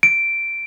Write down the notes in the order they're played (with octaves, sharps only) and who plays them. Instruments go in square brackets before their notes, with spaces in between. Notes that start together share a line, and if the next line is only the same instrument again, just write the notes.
[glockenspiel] D7